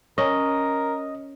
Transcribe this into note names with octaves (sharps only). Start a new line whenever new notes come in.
C#4 A#4 D#5